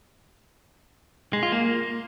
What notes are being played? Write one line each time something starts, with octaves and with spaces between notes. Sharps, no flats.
G#3
F4
A#3